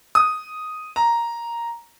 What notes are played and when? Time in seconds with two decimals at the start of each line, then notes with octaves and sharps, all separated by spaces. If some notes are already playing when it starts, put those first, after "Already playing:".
0.15 D#6
0.96 A#5